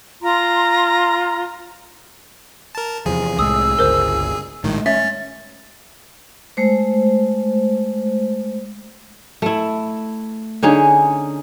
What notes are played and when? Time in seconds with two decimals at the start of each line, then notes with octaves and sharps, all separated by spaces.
0.21 F4 A#5 C6
2.75 A#4 A5
3.06 E2 C3 F3 G#4
3.39 C2 A2 G#3 D#6 E6
3.79 G1 C#2 A#4 C5
4.64 A#1 A2 D#3 G#3 A3
4.86 C#4 E5 A6
6.57 G#3 A3 C5
9.42 A3 E4
10.63 D3 C#4 D#4 G#4